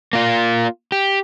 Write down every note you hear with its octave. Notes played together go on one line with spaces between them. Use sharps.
A#3 F4
G4